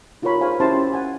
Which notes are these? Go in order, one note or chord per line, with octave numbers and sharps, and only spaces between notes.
D#4 F4 G4 A#4 C#5 B5
G#4 C5 C#5 F5 G#5
C#4 E4 G4 C5 A5 C6
F#5 G#5